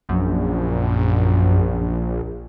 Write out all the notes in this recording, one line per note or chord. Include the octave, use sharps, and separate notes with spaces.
A#1 F#2